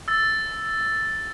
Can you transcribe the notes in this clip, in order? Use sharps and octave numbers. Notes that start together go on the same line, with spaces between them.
E6 A6